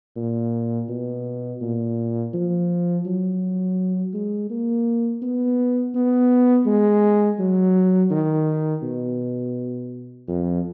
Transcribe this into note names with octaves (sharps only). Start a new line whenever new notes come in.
A#2
B2
A#2
F3
F#3
G#3
A#3
B3
B3
G#3
F#3
D#3
B2
F2